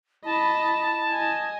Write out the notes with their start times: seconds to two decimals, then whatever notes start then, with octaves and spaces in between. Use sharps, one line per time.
0.25 E4 D#5 A5 B5
1.10 D#5 G#5